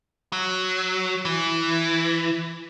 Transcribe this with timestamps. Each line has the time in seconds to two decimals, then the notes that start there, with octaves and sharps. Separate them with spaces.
0.33 F#3
1.25 E3